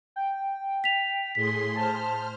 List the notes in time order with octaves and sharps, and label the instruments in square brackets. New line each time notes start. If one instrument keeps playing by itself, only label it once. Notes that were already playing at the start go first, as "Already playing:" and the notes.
[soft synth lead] G5
[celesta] B6 F7
[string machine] A2 G#4 C6 [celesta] B6
[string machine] C5 F6 [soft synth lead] A5